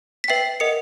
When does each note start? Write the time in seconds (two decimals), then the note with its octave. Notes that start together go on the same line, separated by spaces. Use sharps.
0.24 B6
0.28 B4 E5 G5 C7
0.60 A#4 D#5 F#5 C#7